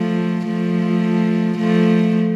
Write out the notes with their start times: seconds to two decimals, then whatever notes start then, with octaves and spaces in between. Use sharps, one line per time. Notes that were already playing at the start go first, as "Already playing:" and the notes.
Already playing: F3 A3
0.47 F3 A3
1.58 F3 A3